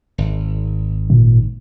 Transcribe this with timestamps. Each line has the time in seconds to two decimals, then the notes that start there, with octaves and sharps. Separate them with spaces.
0.18 G#1
1.10 A#2